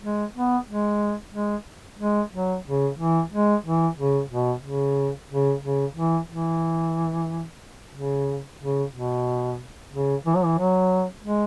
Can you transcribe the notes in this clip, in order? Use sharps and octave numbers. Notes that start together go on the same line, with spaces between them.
G#3
B3
G#3
G#3
G#3
F#3
C#3
E3
G#3
E3
C#3
B2
C#3
C#3
C#3
E3
E3
C#3
C#3
B2
C#3
E3
F#3
E3
F#3
G#3